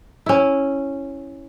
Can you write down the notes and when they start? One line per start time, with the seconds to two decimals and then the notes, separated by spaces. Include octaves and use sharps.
0.26 C#4 E4